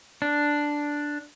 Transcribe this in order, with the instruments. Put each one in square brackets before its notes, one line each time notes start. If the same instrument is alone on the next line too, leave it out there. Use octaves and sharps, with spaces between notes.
[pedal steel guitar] D4